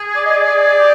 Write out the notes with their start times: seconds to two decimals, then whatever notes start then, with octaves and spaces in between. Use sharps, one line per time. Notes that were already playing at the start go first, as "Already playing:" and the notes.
Already playing: G#4
0.16 D5
0.25 D#5
0.35 D5
0.78 G4